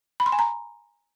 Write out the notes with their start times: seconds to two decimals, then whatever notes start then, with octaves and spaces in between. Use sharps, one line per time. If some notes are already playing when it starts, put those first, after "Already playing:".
0.20 B5
0.26 C6
0.32 G#5
0.39 A#5